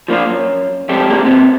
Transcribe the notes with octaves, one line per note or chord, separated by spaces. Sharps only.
F3 A#3 D4 F4
F#2
F2 G#2 G3 G4 A4
D3 F#3 A#3 G4 G#4
C3 B3 C4